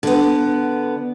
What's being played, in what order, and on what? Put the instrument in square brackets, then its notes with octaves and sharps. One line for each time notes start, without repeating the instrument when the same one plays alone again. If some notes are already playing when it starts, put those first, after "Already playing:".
[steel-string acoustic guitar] D3 B3